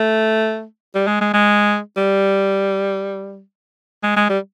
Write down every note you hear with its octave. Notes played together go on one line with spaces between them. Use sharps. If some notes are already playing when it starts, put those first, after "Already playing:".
Already playing: A3
G3
G#3
G#3
G#3
G3
G#3
G#3
G3